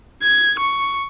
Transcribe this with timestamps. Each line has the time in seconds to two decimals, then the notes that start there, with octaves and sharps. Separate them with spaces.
0.23 G#6
0.59 C#6